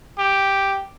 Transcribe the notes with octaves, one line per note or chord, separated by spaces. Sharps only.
G4